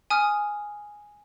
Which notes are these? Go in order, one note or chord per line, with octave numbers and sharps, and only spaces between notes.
G#5 D#6 F6